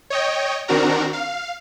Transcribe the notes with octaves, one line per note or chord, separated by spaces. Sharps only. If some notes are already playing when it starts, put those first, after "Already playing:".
C#5 D#5 G5
D#3 C4 D4 F#4 A#4 A#5
F5